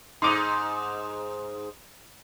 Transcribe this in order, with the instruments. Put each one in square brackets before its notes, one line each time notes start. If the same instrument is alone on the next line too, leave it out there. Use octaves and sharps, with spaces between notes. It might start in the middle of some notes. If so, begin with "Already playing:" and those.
[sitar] G#2 D#4 [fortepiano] C6 D6 D#6